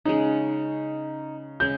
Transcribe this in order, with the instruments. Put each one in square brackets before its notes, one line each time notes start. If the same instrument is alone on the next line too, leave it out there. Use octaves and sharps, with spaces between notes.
[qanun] C#3 G#3 [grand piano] D#4
[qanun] C#3 G#3 [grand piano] G6